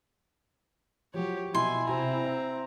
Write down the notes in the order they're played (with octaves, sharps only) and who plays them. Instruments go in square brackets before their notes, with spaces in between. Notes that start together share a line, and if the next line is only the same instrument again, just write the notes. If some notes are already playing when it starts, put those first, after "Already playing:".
[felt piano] F3 F#3 [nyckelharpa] G4 C#5
[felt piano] B2 [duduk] E4 [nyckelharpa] G#5 [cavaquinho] C6
[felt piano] C3 G#5 [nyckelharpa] C4 A#5
[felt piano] E5